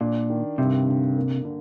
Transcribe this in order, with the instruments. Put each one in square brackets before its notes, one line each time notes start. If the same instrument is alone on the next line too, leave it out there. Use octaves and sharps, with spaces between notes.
[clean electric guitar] A#2 [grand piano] D4
[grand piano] D#3
[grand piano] G2 [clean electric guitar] C3
[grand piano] D3
A#3
D3